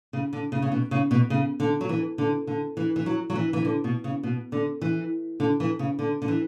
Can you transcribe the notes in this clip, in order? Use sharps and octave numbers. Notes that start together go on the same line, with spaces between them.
C#3
D3
C#3
C#3
B2
C#3
B2
C#3
D3
F#3
E3
D3
D3
E3
E3
F#3
F#3
E3
E3
D3
B2
C#3
B2
D3
E3
D3
E3
C#3
D3
D3
E3